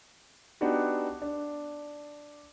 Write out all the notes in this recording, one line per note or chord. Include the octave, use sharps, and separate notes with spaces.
B3 D4 D#4 F#4 G4
D4